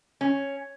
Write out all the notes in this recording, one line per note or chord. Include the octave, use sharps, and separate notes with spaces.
C#4